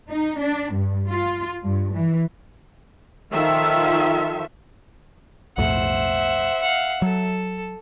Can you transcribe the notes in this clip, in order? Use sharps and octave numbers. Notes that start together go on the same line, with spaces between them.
D#4
D4
G2
F4
G2
E3
D#3 F3 F4 A4 E5
B1 F2 A2 C5 E5 F#5
F5 F#5
F#3 A4